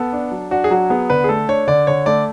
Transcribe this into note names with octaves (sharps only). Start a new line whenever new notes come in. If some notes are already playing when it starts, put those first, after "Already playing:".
Already playing: B3 A4
D4
F#3
D4 F#4
G#4
F#3 F#4
B3 G#4
D3 B4
G#4
A3 A4
D4 C#5
D3 D5
D3 C#5
A3 D5